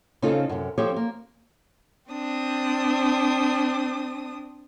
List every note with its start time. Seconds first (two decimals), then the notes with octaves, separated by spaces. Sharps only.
0.22 C#3 C4 D#4 F4 A4
0.49 F#2 C3
0.78 F3 C4 G4 A4 C#5
0.96 A#3
2.10 C4 D4 D#6